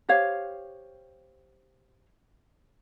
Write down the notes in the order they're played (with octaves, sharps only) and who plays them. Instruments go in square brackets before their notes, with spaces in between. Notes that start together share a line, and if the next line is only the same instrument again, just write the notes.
[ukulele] G4 C5 C#5 F5